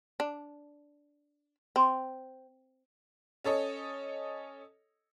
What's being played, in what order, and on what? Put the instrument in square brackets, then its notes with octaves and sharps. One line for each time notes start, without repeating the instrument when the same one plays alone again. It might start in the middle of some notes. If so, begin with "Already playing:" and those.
[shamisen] D4
C4
[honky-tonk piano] C#4 A4 C#5 D#5